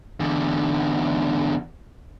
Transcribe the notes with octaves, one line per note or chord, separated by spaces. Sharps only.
E2 D3